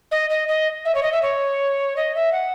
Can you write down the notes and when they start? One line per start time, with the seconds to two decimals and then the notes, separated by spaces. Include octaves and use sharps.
0.11 D#5
0.30 D#5
0.48 D#5
0.85 E5
0.95 C#5
1.03 D#5
1.12 E5
1.22 C#5
1.96 D#5
2.15 E5
2.32 F#5